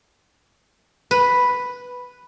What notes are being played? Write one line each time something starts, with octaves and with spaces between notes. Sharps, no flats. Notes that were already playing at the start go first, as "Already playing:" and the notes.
B4